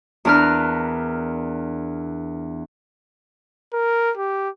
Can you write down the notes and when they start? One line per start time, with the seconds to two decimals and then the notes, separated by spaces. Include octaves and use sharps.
0.25 E2 D4 A#4 B4 F6
3.73 A#4
4.17 G4